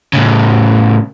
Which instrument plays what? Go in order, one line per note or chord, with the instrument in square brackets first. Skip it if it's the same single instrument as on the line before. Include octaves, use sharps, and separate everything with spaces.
[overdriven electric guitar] A2 C#3